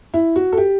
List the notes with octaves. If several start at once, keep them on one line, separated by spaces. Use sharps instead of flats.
E4
F#4
A4
G4